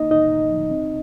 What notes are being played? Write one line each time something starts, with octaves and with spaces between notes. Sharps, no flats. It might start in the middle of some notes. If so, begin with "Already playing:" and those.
Already playing: A#3 D#4 D#5
A2 D#4 D#5
A2
F3
C4